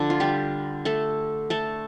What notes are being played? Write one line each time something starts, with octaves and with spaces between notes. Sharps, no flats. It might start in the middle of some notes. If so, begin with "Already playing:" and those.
Already playing: D3 F3 D4
F4
G3 G4
A3 A4
A3 A4